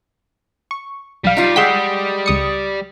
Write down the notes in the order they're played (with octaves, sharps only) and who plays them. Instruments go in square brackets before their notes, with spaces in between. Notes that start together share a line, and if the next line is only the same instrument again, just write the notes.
[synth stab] C#6
[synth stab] B1 F5 [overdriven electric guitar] G3
[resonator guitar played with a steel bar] D#4 F4
[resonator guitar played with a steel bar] G#3 F#5 G5 [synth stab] E6 G6 B6
[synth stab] C#2 D#6 C#7